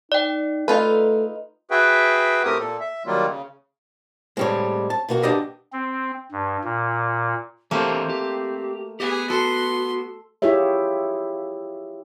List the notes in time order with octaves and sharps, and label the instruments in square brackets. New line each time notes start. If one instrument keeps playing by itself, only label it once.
[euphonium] D#4 [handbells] D5 G5
[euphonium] A3 [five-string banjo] D#4 F4 B4 [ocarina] A4
[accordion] F#4 G#4 B4 E5 G5
A2 A3 C4 G4 A#4 D#6
A#2 A4
E5
D#3 F#3 G3 A#3 F4
C#3
[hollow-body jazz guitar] A2 G3 G#3 [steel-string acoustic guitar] C4 C#5
[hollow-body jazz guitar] A5
[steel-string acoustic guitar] B2 A#3 F#4
[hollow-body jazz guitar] D4 G4 D#5
[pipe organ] C4
G2
A#2
[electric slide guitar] E3 G4 C5 [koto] A3 A#3 [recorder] C4
[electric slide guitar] G4
[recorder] B3 [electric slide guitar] G4 [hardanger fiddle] G#4
[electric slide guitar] F#4 [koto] A4 [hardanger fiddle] C6
[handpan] E4 F4 G4 G#4 C#5 E5